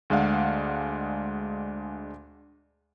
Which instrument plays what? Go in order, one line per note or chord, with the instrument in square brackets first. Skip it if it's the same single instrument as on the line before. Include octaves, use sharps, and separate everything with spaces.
[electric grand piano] D2 G#3 D4 F5 F#5